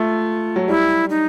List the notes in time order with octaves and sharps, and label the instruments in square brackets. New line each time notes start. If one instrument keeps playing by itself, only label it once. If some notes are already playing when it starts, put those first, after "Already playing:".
Already playing: [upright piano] A3 [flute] F4
[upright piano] F#3
[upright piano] G3 [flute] E4
[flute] D#4